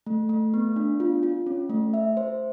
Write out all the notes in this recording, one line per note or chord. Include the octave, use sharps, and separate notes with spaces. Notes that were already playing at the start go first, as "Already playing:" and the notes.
A3
A3
B3
D4
F4
F4
C#4
A3
E5
C5